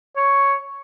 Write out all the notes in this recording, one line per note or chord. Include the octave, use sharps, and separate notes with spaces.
C#5